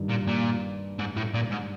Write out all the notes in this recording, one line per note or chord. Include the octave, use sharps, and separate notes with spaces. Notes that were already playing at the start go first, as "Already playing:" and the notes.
Already playing: G2 D#3 G3
A#2
A#2
G#2
A2
A#2
G#2